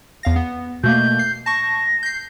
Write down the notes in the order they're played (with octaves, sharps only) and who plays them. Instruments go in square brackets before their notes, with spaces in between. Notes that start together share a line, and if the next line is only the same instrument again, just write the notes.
[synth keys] E2 F5 A#6
B3
[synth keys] B2 A3 A#3 [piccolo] G6
[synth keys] C7
[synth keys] A5 C#6 [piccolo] A#6
[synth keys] G6 C7